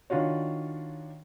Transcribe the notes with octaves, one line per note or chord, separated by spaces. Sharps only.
D#3 D4 F4 F#4 C#5